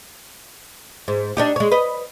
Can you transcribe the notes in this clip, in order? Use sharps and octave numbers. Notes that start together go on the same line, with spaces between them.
G#2
D4 D#4 G4
G#3 C#5
B4 D#5